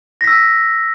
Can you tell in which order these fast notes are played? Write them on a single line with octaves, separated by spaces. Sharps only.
A#6 B6 E6